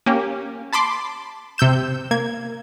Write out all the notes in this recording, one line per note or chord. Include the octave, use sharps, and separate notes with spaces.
A#3 C#4 G4
A5 B5 C6 D6
C3 E6 G6 E7
A#3 G#6